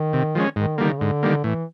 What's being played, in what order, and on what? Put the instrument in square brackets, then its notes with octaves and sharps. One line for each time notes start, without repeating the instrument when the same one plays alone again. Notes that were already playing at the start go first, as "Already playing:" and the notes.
Already playing: [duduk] D#3
[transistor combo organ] C3
F3 G#3 C#4
[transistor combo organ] G#2 [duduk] D#3
[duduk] D3 [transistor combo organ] D#3 G3 A#3
[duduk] C#3
[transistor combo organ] G#2 [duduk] D3
[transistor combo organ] D#3 G3 A#3
[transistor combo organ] A2 [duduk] E3